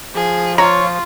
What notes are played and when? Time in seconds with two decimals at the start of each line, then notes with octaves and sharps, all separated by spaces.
0.15 F3 G#4
0.58 F4 C#5 A#5